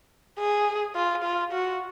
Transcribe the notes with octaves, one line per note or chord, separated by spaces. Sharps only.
G#4
F4
F4
F#4